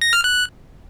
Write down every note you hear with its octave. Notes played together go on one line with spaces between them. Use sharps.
A#6
F6
F#6